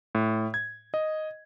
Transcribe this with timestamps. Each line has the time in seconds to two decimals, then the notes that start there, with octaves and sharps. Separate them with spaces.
0.15 A2
0.54 G#6
0.94 D#5